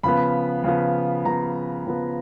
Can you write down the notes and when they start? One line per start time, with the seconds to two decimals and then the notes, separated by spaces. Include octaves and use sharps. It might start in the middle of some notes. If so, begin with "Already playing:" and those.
0.03 C#3 F3 B3 B5
0.64 C#3 F3 B3
1.25 C#3 F3 B3 A#5
1.86 C#3 F3 B3